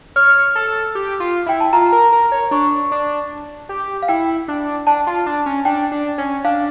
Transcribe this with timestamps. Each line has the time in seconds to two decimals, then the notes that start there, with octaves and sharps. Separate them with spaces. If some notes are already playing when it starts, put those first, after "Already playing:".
0.16 C#5 F6
0.56 A4
0.95 G4
1.20 F4
1.46 E4 G5
1.60 A5
1.73 F4 A#5
1.93 A#4
2.12 A#4
2.32 C#5
2.51 D4 C#6
2.92 D4
3.69 G4
4.03 F5
4.08 E4 G5
4.48 D4
4.87 D4 A5
5.07 F4
5.26 D4
5.46 C#4
5.65 D4 G5
5.92 D4
6.18 C#4
6.45 D4 F5